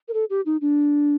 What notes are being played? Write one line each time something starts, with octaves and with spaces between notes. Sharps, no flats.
A#4
A4
G4
D#4
D4